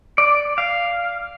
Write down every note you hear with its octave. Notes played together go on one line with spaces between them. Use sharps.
D5
F5